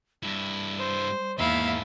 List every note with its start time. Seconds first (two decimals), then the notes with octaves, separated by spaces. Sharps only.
0.23 G2 G3 E4
0.78 C5
1.39 E2 G#2 D#3 A#3 E4 E5 F5